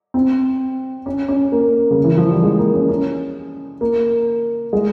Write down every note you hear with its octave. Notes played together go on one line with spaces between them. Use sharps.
C4
C#4
C#4
A#3
C#3
E3
F3
G3
G#3
A#3
C#4
C#4
A#3
G#3